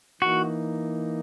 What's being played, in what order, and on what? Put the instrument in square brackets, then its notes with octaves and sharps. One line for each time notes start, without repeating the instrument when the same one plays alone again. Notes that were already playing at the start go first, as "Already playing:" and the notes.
[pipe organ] E3 A#3 D#4 [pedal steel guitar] F#4